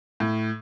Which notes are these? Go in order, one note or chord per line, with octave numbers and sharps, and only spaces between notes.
A2